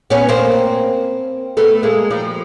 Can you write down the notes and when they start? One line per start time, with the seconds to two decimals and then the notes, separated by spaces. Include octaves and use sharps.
0.10 B3 C#4
0.29 A#3 C4
1.57 A3 B3
1.83 G#3 A#3
2.10 F3 G3